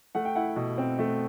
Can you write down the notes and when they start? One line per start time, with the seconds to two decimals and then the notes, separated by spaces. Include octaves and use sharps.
0.15 A3 F#5
0.25 G5
0.35 E4 F#5
0.56 B2
0.78 C4
0.99 A3